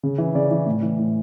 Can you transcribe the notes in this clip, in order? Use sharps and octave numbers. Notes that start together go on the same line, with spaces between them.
C#3
E3
C#3 D5
E3
A2
E3
A2